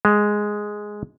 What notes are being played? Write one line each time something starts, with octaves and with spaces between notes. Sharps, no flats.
G#3